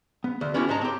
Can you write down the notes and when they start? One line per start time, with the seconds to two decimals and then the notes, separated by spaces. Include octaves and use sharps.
0.24 B3
0.41 D2
0.54 B3 C#4 D4 E4 F#4 G4
0.69 G#2 G#3 C#5 A5 A#5
0.81 C4 G4